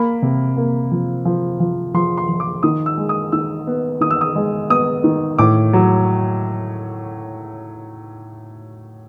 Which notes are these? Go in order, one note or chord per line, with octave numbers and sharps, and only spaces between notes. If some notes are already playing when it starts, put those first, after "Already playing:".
Already playing: A#3 B5
C3
A#3
F3
F3
F3
F3 C6
C6
F3
D6
D#3 D#6
E6
G#3
D#6
D#3 E6
B3
D#3 D#6
E6
D#6
G#3
B3 D#6
D#3
A2 D6
F#3